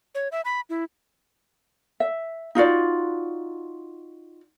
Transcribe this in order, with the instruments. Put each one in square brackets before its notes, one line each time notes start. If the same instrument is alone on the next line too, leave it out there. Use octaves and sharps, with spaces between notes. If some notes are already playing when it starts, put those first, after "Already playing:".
[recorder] C#5
E5
B5
E4
[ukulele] E5
D#4 F4 F#4 D5